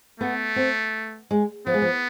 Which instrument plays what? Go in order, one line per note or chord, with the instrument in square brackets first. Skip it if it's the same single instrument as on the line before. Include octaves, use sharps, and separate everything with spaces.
[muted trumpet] A3 [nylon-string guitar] B3
[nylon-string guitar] C4
G#3
[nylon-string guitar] F3 [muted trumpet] B3
[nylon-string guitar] G#3
F3